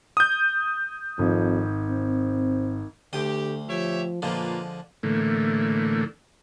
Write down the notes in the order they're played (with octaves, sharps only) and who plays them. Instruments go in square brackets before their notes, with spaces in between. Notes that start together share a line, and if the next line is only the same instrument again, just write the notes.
[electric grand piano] D#6 G6
[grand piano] G#1 [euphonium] F2
[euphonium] C4
[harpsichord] D2 C6 D#6 [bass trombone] D3 [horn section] G4
[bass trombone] F3 [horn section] G4 C#5 E5
[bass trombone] A#2 [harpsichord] D3 F3 G#3 [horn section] A#3 F4 B4
[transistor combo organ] A2 D3 E3 A3 A#3